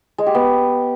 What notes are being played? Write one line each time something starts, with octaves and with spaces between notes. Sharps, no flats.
G#3
G4
B3